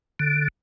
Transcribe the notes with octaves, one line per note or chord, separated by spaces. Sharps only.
D3